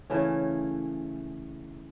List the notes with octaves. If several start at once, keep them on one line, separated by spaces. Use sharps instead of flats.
C#3 E3 A3 C#4